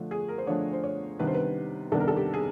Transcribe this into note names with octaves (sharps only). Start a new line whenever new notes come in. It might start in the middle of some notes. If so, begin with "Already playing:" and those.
Already playing: D3 F3 A3 D4
G#4
A#4
C5
D3 F3 A3 D4 C#5
C5
C#5
C3 D#3 G3 B3 D4 B4
C5
B4
C3 D#3 G3 B3 D4 A4
A#4
A4
G4
G#4